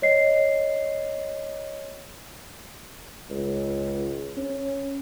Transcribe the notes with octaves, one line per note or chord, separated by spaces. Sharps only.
C#5 D#5 C7
C#2
C#4